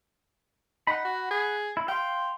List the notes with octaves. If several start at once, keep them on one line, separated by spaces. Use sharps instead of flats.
D#4 F#5 B5
F#4
G#4
E4
F5 G5 C6